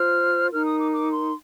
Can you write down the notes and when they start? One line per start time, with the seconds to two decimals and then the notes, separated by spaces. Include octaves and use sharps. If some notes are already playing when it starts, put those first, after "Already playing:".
Already playing: F4 C5 F6
0.51 D#4 A#4 F6
0.65 D#6
0.78 D6
0.92 D6
1.12 C6